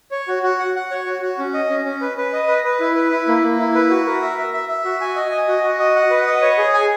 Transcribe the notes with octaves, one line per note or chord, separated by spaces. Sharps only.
C#5
F#4
F#4
F#5
F#5
C#5
F#4
F#4
C#4
D#5
C#4
C#4
B4
B4
D#5
B4
B4
E4
B4
E4
A#3
A#3
E4
B4
F#4
A#4
E5
E5
E5
E5
F#4
G#5
D#5
D#5
F#4
F#4
D#5
F#5
B4
D#5
C#5
G#4
G#5